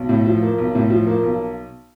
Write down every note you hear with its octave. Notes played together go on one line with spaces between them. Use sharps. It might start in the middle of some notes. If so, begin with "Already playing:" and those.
Already playing: B1
A2
F3
A#3
B1
A2
F3
A#3
B1